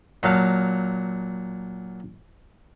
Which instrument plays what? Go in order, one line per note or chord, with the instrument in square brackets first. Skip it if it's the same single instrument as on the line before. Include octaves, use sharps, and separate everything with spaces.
[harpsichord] A#2 F#3 F5 A5